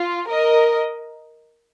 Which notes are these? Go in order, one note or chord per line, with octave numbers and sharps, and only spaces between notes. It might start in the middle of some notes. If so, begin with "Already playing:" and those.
Already playing: F4
A#4 D#5